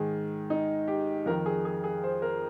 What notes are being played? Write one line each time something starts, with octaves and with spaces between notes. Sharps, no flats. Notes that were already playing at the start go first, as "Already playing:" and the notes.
Already playing: G#2 D#3 G#4
D#4
G4
F2 D#3 A#4
G#4
G#4
G#4
C5
A#4